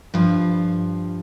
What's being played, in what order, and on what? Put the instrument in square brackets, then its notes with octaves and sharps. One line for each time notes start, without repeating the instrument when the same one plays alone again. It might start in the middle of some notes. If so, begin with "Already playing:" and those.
[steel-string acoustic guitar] G2 F3